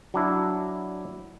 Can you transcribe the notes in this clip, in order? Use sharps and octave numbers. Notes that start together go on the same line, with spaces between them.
F#3 D4 E4